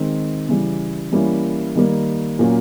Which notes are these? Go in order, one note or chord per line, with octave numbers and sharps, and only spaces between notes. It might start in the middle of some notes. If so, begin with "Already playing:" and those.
Already playing: D#3 G#3 C4
C#3 E3 G3
E3 G3 A#3 C#4 E4
D#3 G3 A#3
A#2 F#3 A#3 C#4